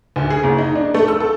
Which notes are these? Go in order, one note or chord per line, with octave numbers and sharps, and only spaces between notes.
D2
G#4
F#1
D#4
D4
A3
E6
A4